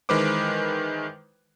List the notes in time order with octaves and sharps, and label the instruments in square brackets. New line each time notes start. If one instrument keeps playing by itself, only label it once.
[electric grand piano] D#3 E3 G#3 B4 C5 D6